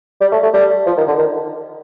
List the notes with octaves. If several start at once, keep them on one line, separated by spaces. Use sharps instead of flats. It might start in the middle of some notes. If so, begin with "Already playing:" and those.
G3
A3
A3
G3
F3
D#3
D3
D#3